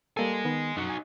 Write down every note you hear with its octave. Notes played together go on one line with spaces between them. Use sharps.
G3 A#3 A4 D#5 G#5
D#3 B3
F#2 D#4 F#4
G#5